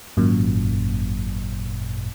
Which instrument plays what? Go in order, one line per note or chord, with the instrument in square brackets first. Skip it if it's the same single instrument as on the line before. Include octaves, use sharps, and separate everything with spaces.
[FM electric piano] G#1 F#2 A#2